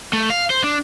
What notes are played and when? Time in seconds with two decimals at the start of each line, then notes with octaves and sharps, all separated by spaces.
0.13 A3
0.30 F5
0.50 C5
0.64 D4